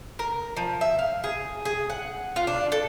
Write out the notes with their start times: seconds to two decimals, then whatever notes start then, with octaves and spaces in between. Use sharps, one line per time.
0.19 A#4
0.57 F3
0.81 E5
0.99 F5
1.24 G#4
1.65 G#4
1.90 F#5
2.36 F4
2.47 D4
2.72 A4